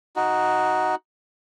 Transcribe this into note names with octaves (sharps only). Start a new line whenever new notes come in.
D#4 F#4